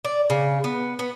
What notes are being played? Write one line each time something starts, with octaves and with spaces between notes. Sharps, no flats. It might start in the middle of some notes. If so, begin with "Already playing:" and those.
D5
C#3
B3
B3